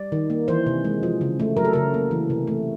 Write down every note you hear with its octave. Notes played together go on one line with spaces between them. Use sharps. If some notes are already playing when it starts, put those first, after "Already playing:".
Already playing: G3 D5
D#3
A#3
E3 C5
C3
G#3
F3
C#3
A3
F#3 A#4
A4
C#3 A#4
A#3
E3
C3
A3